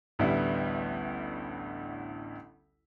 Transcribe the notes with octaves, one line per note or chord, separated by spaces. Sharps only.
A1 D2 G3 B3 E4